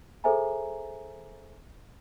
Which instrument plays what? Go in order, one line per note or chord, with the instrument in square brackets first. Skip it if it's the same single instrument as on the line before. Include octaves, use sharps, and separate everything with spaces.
[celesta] G#4 A4 C5 E5 G#5 A#5